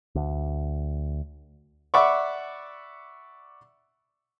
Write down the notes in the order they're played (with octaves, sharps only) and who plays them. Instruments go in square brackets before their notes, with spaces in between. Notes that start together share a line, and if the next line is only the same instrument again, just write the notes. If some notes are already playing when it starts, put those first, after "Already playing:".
[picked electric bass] D2
[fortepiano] D5 E5 F#5 B5 C#6 D6